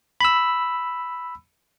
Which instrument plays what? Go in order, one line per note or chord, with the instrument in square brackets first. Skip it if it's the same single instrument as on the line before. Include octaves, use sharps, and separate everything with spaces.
[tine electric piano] B5 E6